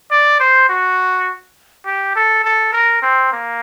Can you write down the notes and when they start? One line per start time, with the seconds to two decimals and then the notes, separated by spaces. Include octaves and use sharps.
0.11 D5
0.40 C5
0.69 F#4
1.86 G4
2.16 A4
2.44 A4
2.73 A#4
3.02 C4
3.32 A#3